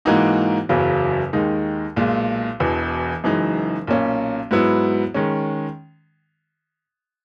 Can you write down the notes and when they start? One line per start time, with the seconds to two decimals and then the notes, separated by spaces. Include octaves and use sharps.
0.05 G#2 E3 A#3 D#4 F#4
0.69 F#1 E2 C#3 F#3
1.33 D#2 D#3 G#3 D#4
1.96 B1 A#2 G#3
2.60 E1 E2 B2
3.24 F#1 F#2 E3 G#3 D#4
3.87 B1 A#2 A#3 C#4
4.51 G#2 F#3 B3 E4
5.14 D#3 G#3 C#4